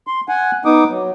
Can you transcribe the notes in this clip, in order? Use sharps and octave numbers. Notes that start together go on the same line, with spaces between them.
C6
F#5 G#5
B3 D#4 D6 D#6
F#3